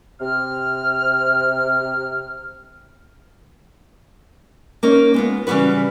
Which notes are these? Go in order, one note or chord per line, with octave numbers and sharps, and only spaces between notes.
C3 F6
A#3 C#4 D#4
G#3 B3 F4
C#3 E3 G3 F#4 B4